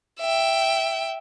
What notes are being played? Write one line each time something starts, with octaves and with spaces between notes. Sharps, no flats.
E5 G5